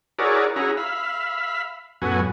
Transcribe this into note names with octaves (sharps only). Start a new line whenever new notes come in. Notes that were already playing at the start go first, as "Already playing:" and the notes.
E4 F#4 G#4 A#4 C#5 D5
C#4 E4 F#4 G#4 A#5
E5 F5 B5
F#2 A2 B3 F#4 G#5